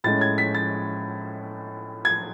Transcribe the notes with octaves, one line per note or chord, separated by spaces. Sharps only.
A2 G#3 C#4 A6
G#6
B6
A6
G#6